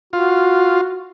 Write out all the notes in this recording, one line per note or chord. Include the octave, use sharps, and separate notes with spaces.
F4 F#4